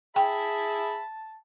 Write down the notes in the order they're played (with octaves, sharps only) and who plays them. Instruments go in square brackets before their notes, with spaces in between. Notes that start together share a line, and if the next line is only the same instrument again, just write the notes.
[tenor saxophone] G#4 [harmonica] E5 B5 [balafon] G5 [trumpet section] A5